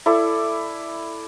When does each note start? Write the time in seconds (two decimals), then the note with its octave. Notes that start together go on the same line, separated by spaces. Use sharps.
0.06 E4 A4 D5